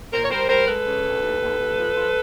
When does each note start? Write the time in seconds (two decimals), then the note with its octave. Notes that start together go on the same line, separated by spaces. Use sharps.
0.13 A#2 A#4 C5
0.24 C#5
0.31 G3 A#4 C5
0.50 G3 A#4 C5
0.68 G#3 A4 B4
0.86 C#3
1.04 D2
1.23 D#2
1.41 D#2
1.59 D#2
1.77 F3
1.95 F3